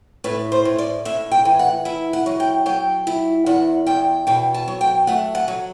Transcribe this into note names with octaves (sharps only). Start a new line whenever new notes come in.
A2 B4
C5
A2
D5
A2 E5
G5
E3
F#5
E4 E5
F#5
F#3
G5
F#3 G5
E4
E2 F#5
E2 G5
B2 G5
A5
F#3
G5
A3 F#5
F#5
F#3